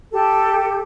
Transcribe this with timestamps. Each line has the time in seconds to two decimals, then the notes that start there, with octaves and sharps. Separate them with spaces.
0.12 G4 A4